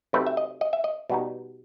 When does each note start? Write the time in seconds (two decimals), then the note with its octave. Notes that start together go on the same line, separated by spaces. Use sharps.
0.13 C3 F#3 A3 C4 D#4 B4
0.27 E5
0.37 D#5
0.61 D#5
0.73 E5
0.84 D#5
1.10 B2 G3 B3 D#4